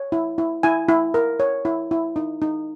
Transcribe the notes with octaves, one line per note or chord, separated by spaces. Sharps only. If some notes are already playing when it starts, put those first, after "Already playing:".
Already playing: C#5
E4
E4
E4 G#5
E4
A#4
C#5
E4
E4
D#4
D#4